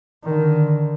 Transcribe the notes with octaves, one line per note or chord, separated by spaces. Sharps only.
D3 D#3